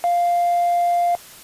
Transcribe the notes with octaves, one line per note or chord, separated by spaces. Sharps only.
F5